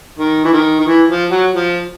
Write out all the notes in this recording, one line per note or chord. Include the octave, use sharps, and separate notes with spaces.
D#3
E3
D#3
D#3
E3
F3
F#3
F3